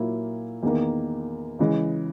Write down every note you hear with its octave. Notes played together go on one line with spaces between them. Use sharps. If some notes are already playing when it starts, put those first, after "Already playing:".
Already playing: A#2 F#3 A#3 E4
E2 D#3 A#3
C#3 E3 G#3